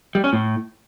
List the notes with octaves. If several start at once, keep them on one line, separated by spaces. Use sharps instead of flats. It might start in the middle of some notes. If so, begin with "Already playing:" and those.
G3
C#4
A2